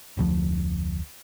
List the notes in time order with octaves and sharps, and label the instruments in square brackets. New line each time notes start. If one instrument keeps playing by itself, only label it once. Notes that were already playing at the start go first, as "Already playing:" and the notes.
[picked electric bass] F1 D2 F3